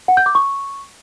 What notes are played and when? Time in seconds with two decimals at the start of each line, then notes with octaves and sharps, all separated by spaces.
0.08 F#5
0.17 G6
0.26 D6
0.35 C#6